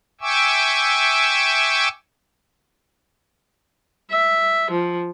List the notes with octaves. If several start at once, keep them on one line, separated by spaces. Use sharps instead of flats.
E5 G5 G#5 C#6 D6 E6
E5
F3